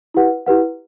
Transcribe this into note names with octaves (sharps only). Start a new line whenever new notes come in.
E4 G4 B4 F#5
E4 G4 B4 F#5